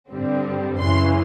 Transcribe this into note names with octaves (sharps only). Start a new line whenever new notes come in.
G2 D3 G3 C4
F#2 C#3 E3 C6